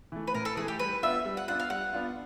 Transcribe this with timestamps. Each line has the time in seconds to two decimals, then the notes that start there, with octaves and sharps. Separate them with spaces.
0.12 E3 A3
0.27 B4
0.34 A2 A#4
0.45 A4
0.57 E3 A3 G#4
0.68 G4
0.79 G3 B4
1.03 B3 D4 F4 E5
1.25 G3
1.37 F#5
1.48 B3 D4 F4 F#5
1.60 F5
1.70 G3 F#5
1.93 B3 D4 F4